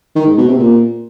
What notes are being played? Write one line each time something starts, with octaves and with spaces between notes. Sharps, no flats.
D#3
G#2
B2
C3
A#2